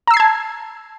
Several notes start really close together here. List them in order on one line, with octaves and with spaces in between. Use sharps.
A#5 E6 C7 G#6 A5